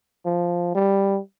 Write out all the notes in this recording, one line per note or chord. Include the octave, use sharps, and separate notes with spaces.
F3
G3